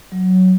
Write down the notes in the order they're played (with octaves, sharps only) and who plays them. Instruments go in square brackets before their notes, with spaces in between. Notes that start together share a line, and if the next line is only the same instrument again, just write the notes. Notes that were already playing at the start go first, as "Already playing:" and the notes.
[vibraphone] F#3